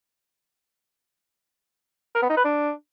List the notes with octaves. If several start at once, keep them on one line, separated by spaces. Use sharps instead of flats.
A#4
B3
D#4
B4
D4